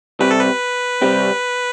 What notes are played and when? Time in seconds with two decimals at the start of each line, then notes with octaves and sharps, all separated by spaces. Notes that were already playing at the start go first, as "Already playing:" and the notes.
0.20 C3 G3 C4 G4 B4
0.31 A4
0.40 B4
1.02 C3 G3 C4 G4